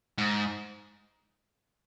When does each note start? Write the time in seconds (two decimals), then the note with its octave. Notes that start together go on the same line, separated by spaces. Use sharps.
0.18 G#2